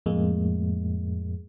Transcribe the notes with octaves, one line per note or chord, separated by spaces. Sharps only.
F2 A2 G#3 A#3